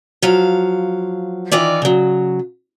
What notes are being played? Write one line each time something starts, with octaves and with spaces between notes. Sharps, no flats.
F3 F#3 F5
D#3 E3 F4 D5
C#3 F#3